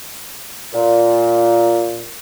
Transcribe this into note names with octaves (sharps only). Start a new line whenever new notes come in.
A#2